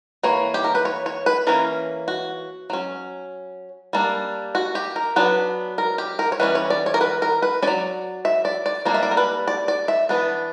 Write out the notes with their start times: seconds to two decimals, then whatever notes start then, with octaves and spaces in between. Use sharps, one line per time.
0.23 E3 A#3 C#5
0.54 G4
0.64 A#4
0.75 B4
0.85 C#5
1.06 C#5
1.26 B4
1.47 E3 A#3 C#4 A#4
2.08 F#4
2.70 F#3 C#4
3.93 G3 A#3 D4
4.55 F#4
4.75 G4
4.96 A#4
5.16 F#3 B3 D4 B4
5.78 A#4
5.98 G4
6.19 A#4
6.32 C#5
6.40 E3 G3 C#4 B4
6.55 C#5
6.70 D5
6.86 C#5
6.94 A#4
7.01 B4
7.22 A#4
7.42 B4
7.63 F#3 C#4 D5
8.25 E5
8.45 D5
8.66 D5
8.85 G3 A#3 D4 D5
8.94 E5
9.03 D5
9.11 A#4
9.17 B4
9.48 D5
9.68 D5
9.88 E5
10.09 E3 B3 D4